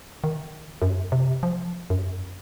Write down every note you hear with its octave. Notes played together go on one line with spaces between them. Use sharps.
D#3
F#2
C3
F3
F#2